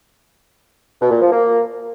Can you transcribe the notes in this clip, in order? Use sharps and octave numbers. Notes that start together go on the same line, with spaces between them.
B2
A#2
F3
A#3